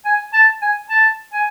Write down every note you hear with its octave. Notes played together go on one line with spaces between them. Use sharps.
G#5
A5
G#5
A5
G#5